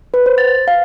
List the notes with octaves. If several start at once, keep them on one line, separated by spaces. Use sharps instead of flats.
B4
C5
A6
F5